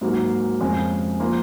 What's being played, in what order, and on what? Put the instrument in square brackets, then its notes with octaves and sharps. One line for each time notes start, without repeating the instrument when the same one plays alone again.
[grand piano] G#2 F#3 A#3
F2 C#3 G#3
F3 A#3 F4